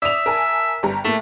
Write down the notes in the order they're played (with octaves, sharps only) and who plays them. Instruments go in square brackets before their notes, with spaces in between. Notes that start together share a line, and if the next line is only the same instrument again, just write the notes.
[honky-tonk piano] D5 D#6 F7 [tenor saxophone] E5
[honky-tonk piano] A#4 G#5 A5
G1 G3 A#5
[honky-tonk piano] A2 A#3 [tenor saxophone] A3